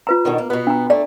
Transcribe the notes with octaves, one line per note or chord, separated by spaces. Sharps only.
F4 B4 A#5
B2 D3 D#3
A#3
B2 B3
D4 A#5
A3 D4 D5